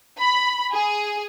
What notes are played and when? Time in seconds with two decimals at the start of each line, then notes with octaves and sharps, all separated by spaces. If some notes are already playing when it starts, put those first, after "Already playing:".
0.19 B5
0.73 G#4